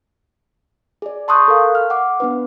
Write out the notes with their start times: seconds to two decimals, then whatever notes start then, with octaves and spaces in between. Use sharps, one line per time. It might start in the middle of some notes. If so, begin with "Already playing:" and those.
1.02 G#4 D5
1.28 A5 C6 C#6 D#6 F#6 G6
1.48 A4 A#4 F5
1.75 F6
1.90 F#5 D6
2.20 B3 D4 B4